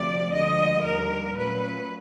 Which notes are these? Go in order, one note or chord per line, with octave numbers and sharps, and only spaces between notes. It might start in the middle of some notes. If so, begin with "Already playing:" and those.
Already playing: D2 C3 F3 D5
D2 D3 F3 G#3 D#5
D#2 D3 G3 A#4
A#2 F#3 A3 C#4 B4